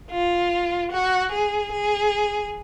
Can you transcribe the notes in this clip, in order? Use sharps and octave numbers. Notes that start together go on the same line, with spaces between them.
F4
F#4
G#4
G#4